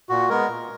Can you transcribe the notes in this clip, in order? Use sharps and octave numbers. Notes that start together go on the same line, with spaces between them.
A#2 F#4
G#3 B3 A#4
A#2